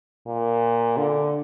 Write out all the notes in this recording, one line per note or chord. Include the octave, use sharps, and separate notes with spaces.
A#2
D3